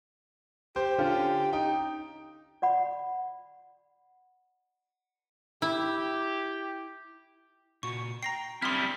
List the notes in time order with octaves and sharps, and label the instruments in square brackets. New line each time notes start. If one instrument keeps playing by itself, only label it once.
[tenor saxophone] G4 [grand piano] C5
[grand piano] D3 C#4 F4
[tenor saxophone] D#4 [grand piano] G5
[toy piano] D5 F#5 B5
[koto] E4 [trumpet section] G4
[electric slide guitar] A#2 F#4 [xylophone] C#6
[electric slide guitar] G5 [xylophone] A#5 A#6 C7
[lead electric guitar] G3 E4 [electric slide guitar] C4 D4 [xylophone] C6 D#6 F6